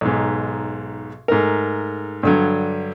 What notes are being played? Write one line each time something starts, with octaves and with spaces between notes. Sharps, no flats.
B1 G#2
G#2 A3 A#4
G2 D3 F#3